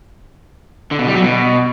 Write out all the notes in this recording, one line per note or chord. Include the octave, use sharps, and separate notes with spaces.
D3
B2
G3
F#3
B2